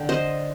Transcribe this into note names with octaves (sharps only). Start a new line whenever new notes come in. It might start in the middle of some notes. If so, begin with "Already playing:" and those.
Already playing: D3 G5
C5 D#5